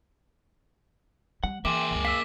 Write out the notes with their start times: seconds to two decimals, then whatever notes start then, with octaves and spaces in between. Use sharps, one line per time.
1.44 G3 F#5
1.65 E3 A#3 G#4 E5 G5 C6 D6
1.91 C#2 F#2
2.05 F5 E6 B6